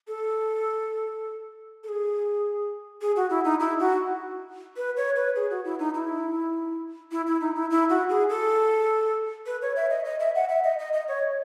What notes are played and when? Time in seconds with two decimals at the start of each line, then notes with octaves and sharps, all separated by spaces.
0.08 A4
1.84 A4
1.89 G#4
3.01 G#4
3.16 F#4
3.30 E4
3.44 D#4
3.60 E4
3.80 F#4
4.77 B4
4.97 C#5
5.16 B4
5.36 G#4
5.51 F#4
5.65 E4
5.79 D#4
5.94 E4
7.12 E4
7.27 E4
7.41 D#4
7.55 E4
7.70 E4
7.90 F#4
8.09 G#4
8.30 A4
9.46 B4
9.62 C#5
9.76 E5
9.90 D#5
10.05 D#5
10.20 E5
10.35 F#5
10.49 E5
10.64 D#5
10.79 D#5
10.93 D#5
11.08 C#5